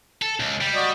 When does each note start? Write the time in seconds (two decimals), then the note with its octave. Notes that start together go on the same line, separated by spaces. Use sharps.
0.22 A4
0.40 C#2
0.61 G3
0.74 F#4 D5 D#5